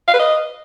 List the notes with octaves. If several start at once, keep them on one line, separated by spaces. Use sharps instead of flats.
F5
B4
D#5